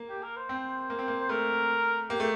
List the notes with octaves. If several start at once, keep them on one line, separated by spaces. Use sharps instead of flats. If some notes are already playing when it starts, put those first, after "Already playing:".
Already playing: A#3
G4
A#4
C5
C4
A#3
C4
A#3
C5
A3 A#4
A#3 G4
A3